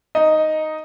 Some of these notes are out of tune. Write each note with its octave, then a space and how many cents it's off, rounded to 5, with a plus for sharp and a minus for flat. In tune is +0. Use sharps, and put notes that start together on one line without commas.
D#4 +0 D#5 +0